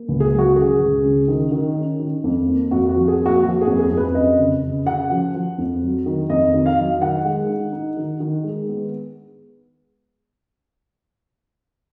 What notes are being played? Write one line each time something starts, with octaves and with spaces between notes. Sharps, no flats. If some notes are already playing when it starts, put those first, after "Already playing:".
Already playing: A#3
C#2
G#4
F#3
F#4
C#3 G#4
C#2
C#3
D#3
D#3
C#4
D#3
F2
A#3
F2 F#4
F#4
F3
G#4
A#3
F#4
F3 F#4
G#4
F2
G#4
F2
B4
F#2 D#5
C#3
C#3
C#3 F#5
F3
F3
F2
F#3
D#3
F2 D#5
D#3
F5
F#3
D#3 F#5
G#3
D#4
D#4
D#3
D#3
G#3
B3